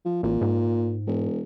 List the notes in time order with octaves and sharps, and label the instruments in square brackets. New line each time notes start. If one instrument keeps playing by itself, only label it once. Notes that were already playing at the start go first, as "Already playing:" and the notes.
[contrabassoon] F3
[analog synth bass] A1 [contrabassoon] A#2
[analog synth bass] G#2
[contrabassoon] E1